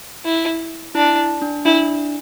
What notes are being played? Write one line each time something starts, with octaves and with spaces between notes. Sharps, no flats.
E4
D4 E4
D4
D4 E4